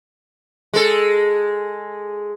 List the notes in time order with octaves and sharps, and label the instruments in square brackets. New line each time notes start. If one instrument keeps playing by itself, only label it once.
[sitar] G#3 A4